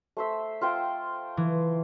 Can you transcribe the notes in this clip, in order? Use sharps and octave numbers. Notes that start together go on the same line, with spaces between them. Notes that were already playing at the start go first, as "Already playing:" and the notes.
A3 C5 E5
F4 C5 G5
E3